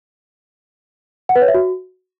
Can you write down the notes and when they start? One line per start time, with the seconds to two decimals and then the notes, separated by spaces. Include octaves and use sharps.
1.29 F#5
1.36 B4
1.42 C#5
1.48 E5
1.54 F#4